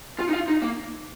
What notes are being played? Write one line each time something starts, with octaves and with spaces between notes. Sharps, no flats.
F4
D#4
F4
D#4
A#3